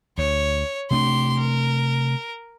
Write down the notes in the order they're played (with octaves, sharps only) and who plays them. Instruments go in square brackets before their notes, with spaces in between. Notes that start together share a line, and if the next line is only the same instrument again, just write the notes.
[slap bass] D2 [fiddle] C#5
[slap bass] C3 A3 D4 [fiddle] G4 C6
[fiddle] A#4